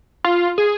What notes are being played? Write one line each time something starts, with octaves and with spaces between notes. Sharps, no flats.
F4
G#4